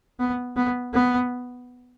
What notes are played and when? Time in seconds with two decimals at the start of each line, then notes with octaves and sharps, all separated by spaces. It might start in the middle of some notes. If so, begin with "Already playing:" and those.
0.20 B3
0.56 B3
0.94 B3